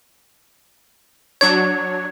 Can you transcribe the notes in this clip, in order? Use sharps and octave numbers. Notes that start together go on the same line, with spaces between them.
F#3 D4 C#5 G#6